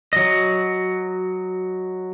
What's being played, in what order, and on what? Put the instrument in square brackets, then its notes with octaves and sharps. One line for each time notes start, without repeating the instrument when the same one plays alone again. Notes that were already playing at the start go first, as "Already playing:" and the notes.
[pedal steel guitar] F#3 D#5